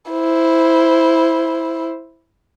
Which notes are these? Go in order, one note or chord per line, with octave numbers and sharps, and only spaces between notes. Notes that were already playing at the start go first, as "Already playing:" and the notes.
E4 C5